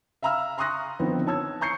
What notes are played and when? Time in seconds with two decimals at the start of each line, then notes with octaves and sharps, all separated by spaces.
0.23 E5 F5 A#5 B5 E6 F6
0.58 A#5 C6 C#6 D#6 F#6 A#6
0.99 D3 D#3 F3 B3 C4
1.27 C#5 A5 E6 G#6
1.61 A#5 C#6 G6 C7 C#7